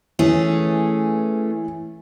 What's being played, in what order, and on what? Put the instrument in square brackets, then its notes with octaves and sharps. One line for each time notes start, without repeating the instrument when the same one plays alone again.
[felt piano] E3 [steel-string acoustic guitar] A3 C#4 G#4